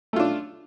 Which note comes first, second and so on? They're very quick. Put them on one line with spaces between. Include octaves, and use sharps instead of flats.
A3 F4 D4